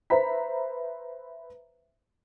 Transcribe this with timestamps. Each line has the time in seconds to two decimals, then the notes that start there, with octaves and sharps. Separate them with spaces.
0.10 B4 C5 E5 A#5 B5 B6